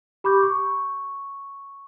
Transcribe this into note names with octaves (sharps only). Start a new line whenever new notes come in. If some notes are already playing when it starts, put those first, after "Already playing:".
G4 B5 C#6 D6 G6
C#6